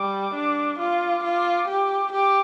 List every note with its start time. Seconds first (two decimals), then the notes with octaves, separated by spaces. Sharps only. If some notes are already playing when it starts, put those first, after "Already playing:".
Already playing: G3 D6
0.34 D4
0.79 F4 D6
1.24 F4
1.68 G4
2.13 G4 D6